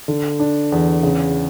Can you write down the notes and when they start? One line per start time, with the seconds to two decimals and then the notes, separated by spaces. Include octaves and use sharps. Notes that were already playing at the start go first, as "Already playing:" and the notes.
0.08 D3
0.40 D4
0.72 E2
1.03 C#3